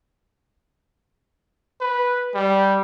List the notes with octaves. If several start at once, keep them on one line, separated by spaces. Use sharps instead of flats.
B4
G3